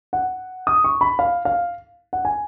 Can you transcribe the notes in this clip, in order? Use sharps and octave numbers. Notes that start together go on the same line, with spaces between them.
F#5
D#6
C#6
B5
F5
F5
F#5
G#5